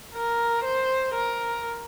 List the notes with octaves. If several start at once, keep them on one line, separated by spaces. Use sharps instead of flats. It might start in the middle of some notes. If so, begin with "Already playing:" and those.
A#4
C5
A#4